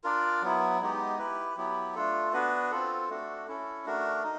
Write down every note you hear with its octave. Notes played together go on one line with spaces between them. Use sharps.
D4 F4 A#4 D5
F#3 B3 E4
G#3 B3 D#4 G4
E4 G4 B4
F#3 B3 E4 G4
A3 D4 F4 A4
B3 D4 F#4 B4
C4 F4 A4
A3 D4 F#4 A4
C#4 E4 A4
A3 D4 F#4 A#4
D#4